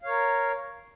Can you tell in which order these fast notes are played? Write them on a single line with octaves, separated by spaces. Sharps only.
F5 C#5 A#4